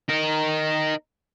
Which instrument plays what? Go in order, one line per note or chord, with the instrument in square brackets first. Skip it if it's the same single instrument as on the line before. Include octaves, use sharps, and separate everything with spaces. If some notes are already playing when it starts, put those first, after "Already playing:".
[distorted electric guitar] D#4 A#4